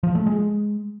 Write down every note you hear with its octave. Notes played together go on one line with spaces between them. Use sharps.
F3
A3
G#3